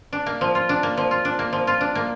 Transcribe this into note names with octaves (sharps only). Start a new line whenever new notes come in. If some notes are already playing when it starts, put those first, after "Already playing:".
D4
A#3
F3
F4
D4
A#3
F3
F4
D4
A#3
F3
F4
D4
A#3